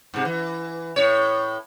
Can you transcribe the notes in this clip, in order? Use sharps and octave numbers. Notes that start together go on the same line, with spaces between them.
G#2 C3
E3
A2 C#5